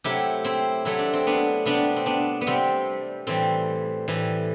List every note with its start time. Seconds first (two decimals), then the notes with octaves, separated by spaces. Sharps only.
0.04 C3 F#3 A3 E4 G4
0.45 C4 E4
0.85 C3 F#3 A3 E4
0.99 D4
1.13 C4
1.27 B3 D4
1.66 C3 G3 B3 D4
1.96 C4
2.06 B3 D4
2.41 B3
2.47 C3 G3 C4
3.27 A2 E3 G3 C4
4.08 A2 E3 G3